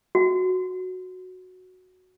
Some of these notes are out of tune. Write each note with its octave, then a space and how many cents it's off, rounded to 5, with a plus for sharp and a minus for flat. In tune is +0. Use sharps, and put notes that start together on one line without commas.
F#4 -5